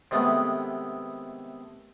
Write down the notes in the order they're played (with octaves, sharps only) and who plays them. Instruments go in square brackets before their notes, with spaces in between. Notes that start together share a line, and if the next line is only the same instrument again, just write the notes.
[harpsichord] C3 D#3 G#3 A3 B3